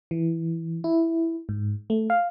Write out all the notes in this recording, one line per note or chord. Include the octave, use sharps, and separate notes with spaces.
E3
E4
G#2
A3
F5